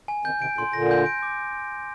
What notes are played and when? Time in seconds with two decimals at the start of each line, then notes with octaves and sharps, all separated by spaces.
0.08 G#5
0.25 C3 D#3 G6
0.41 C3 D#3 D7
0.58 A#2 D3 C6
0.73 A#2 D3 A#6
0.91 G6
1.06 D7
1.23 D6